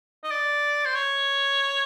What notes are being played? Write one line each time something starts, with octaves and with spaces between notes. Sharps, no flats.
D#5
D5
C5
C#5